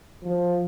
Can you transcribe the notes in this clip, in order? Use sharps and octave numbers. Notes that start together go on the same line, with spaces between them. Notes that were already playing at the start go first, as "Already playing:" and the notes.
F3